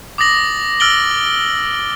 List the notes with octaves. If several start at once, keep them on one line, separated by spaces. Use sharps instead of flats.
D6 D#6 A6 A#6 F#7
E6 F6 A6 D7 F#7 G7